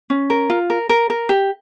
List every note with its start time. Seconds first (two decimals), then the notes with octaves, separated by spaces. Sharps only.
0.10 C#4
0.30 A#4
0.50 F4
0.70 A#4
0.89 A#4
1.10 A#4
1.29 G4